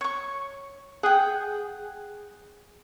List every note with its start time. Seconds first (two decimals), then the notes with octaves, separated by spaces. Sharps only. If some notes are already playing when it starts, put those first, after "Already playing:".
0.01 C#5 C#6
1.03 G#4 F#5 G5